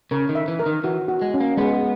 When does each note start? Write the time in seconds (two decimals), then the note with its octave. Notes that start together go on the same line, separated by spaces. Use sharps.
0.11 C#3 A#4
0.29 D#3
0.35 E5
0.48 E3
0.59 A#4
0.66 D#3
0.84 E3 F#4
1.08 F#4
1.22 G#3
1.34 C#4
1.40 A#3
1.58 G#3 B3